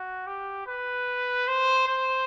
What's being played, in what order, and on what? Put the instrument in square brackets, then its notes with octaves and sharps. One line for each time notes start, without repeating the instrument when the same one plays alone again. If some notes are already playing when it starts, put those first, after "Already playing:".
Already playing: [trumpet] F#4
G4
B4
C5
C5